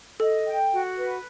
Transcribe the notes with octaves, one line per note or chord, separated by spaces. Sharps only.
A4 D#5
G5
F#4
B4